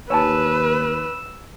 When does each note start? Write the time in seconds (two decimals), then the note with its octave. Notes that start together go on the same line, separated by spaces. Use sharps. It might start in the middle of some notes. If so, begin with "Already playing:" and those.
0.10 D#2 B4 C#5 G#5 A5 E6